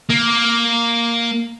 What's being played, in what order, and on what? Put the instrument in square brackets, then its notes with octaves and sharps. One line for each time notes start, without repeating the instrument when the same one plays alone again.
[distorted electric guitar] A#3